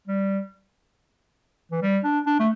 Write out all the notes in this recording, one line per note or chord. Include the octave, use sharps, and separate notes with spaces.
G3
E3
G3
D4
D4
A3